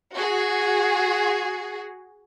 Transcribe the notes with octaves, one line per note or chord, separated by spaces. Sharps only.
F#4 G#4